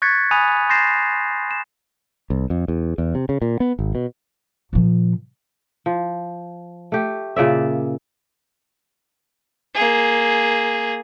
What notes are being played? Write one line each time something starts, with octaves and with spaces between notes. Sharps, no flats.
C#6 F#6 G#6 A6 B6 C#7
G#5 B5 D#6 F#6 D#7 F7
C6 G6 A6 A#6 C7 E7
E7
C2
F2
E2
E2
C3
C#3
A#2
B3
G#1
B2
A#2 F3
F3
A3 G4
A#2 C#3 D5 E5
A#3 G#4